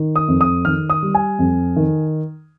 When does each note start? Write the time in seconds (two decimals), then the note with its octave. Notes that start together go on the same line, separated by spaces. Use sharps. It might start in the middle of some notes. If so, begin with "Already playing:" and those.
Already playing: D#3
0.16 D#6
0.28 F2
0.41 D#6
0.65 D#3 F6
0.90 D#6
1.03 G3
1.15 G#5
1.39 F2
1.76 D#3